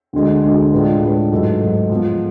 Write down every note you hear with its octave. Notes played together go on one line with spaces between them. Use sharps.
D2 D3 G#3
D2 D3 G#3
A2 G#3 D4 F4 B4
A2 G#3 D4 F4 B4
G#2 F#3 A3
G#2 F#3 A3
F3 G#3 B3